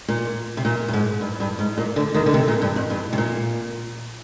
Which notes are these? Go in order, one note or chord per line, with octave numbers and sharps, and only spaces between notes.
A#2
C3
A#2
G2
G#2
G2
G2
G#2
A#2
D2 D3
D#2 D#3
D3
C3
A#2
G2
F2
G2
C3
A#2